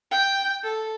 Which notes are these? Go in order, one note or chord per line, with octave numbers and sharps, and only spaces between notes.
G5
A4